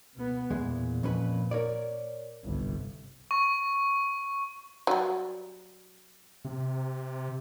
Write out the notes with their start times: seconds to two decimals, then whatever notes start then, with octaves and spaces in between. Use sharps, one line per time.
0.14 B2 B3
0.50 E2 A#2 G#3
1.03 F2 C#4 B4
1.51 A#4 C#5 D5
2.44 G1 C2
3.31 C#6
4.87 F#3 G3
6.45 C3